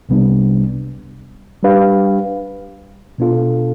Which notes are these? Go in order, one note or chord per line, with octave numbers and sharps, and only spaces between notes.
C2 C3 G3 B3 D4
G3 D4 G4 B4 F5
B2 B3 D4 F4 A4